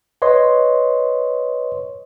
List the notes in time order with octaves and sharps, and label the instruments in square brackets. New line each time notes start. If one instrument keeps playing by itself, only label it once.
[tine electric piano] B4 C#5 D#5 C6